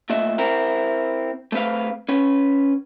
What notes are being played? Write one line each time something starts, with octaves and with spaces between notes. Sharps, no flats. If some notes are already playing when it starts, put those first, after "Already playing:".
A#2 A3 D#5 E5
C4 E4 A#4
A3 C4 B4 F5
C#4 B4